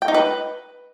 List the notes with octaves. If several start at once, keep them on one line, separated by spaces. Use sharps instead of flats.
G5
D#4
B4